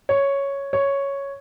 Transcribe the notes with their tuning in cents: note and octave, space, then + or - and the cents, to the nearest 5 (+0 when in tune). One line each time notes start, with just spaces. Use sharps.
C#5 +0
C#5 +0